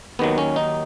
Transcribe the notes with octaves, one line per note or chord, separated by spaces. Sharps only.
D#2 D#3 F#3 B3
C#4
D#4